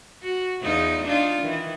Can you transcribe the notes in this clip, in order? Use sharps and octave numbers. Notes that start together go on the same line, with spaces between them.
F#4
E2 D#4 F4
D4 D#4 F4
D#3 E3